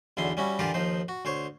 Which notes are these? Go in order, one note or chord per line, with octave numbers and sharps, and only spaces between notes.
B1 E2 D3 E4 C6
G3 C#4 E4 F#4
D3 E3 F4 G4 A#4 D5
D#2 F3 D#4 C5
F#4
D2 C5 C#5 C#6